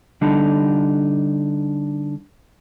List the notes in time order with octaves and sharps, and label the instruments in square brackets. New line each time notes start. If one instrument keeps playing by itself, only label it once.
[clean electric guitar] D3 G3 D4 D#4 A4